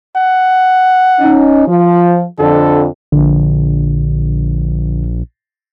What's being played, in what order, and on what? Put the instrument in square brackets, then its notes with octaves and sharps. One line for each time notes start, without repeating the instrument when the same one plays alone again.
[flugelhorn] F#5
[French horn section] C#4 D#4
F3
[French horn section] F2 D3 [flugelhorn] A4
[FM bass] A#1 [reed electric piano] D3